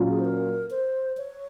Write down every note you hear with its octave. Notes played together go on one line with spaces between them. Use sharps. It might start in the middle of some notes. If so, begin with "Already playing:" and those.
Already playing: A#2 F#3 C#4 F4
G#4
C5
A#4
C5
C#5